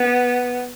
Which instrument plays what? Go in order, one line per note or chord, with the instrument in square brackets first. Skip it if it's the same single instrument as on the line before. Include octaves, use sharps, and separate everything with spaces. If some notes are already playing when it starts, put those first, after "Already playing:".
Already playing: [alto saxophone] B3